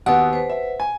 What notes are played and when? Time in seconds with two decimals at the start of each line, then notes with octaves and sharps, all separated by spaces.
0.06 D#2 B3 F#4 F#5 D#6 E6
0.33 B4 C5
0.50 E5
0.80 G#5